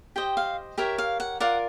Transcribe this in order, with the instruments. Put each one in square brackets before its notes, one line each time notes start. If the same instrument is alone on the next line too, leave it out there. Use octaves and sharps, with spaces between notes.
[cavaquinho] G4 C5 D#5 G5
F5
G4 A#4 C#5 E5
F5
F#5
F4 A#4 D5 F#5